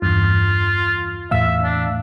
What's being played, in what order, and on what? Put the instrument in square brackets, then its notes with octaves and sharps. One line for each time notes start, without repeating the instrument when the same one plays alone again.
[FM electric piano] E2 G2 [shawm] F4
[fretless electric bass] E2 A2 A3 [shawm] E5 [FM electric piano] F5 E6
[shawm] D4